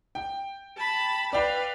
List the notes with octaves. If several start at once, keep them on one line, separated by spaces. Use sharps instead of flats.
G5
A5 B5
B4 D5 F5 G5